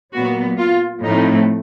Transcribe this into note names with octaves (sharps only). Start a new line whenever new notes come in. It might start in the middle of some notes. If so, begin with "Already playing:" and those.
A#2 F#3 B3 F#4
F4
A2 F3 A3 C4 D#4